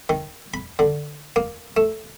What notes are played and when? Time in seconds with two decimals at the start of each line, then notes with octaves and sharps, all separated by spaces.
0.09 D#3
0.54 B5
0.79 D3
1.36 A#3
1.77 A3